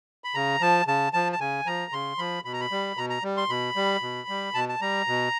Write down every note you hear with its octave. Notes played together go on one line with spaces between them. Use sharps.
B5
C#3 A#5
F3 A5
C#3 A5
F3 A5
A5
C#3 G#5
F3 A#5
C#3 C6
F3 B5
B2 B5
A#5
B5
G3
B2 A#5
A#5
G3
C6
B2 B5
G3
B2
G3
B2 A5
A5
G3 A#5
B2